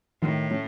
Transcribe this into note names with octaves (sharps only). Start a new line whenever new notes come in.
A2 D#3
A3 C#4